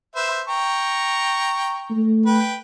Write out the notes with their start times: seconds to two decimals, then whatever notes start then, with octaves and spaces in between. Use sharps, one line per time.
0.16 B4 C5 E5
0.48 G5 A#5 C#6
1.90 A3
2.26 B4 G5